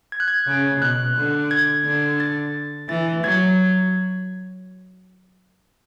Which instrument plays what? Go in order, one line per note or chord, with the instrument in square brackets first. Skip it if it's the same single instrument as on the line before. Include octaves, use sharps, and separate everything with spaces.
[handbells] G#6
F#6
G#6
[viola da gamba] C#3
[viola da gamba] B2 [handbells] F#6
[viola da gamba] D3
[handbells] G#6
[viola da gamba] D3
[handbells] A6
[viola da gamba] E3 [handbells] A6
[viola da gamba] F#3 [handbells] G#6